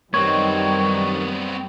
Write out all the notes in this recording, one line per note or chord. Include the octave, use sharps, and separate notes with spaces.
F#2 D#3 G3 B3 C4 C#5